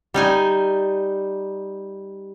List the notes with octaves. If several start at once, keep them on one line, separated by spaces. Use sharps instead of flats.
G3 D#4 G#5